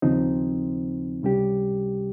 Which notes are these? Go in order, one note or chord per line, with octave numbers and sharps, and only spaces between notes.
D#2 C#3 F3 C4 D#4
C#2 C3 G3 C#4 G4